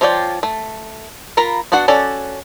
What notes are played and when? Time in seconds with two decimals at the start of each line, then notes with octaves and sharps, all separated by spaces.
0.01 F3 F4 C#5 D5 G5
0.43 A3
1.37 F4 A#4 A#5 B5
1.72 B3 D4 F#4 F#5
1.88 C#4 F#4 A4 D5